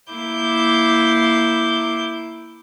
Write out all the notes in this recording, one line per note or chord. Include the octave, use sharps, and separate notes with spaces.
A#3 E4 D6 G6